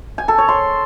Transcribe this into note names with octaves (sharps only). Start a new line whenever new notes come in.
G#5
A4
C#5
C6